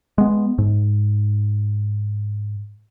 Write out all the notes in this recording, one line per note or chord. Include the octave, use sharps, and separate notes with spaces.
G#3 B3
G#2